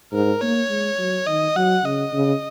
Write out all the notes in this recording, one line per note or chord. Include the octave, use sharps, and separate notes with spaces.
G#2 A#4
A#3 C#5
G#3
F#3
D#3 D#5
F#3 F#5
C#3 D#5
C#3